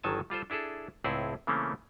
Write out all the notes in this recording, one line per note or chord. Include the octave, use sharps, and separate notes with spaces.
G1 D#3 F#3 A4 G#5 A5
G3 F4 A4 C5
D4 E4 G#4 A4
C#2 A2 C4 E4 G#4 F#5
C#3 E3 A3 A#3 C4 C#4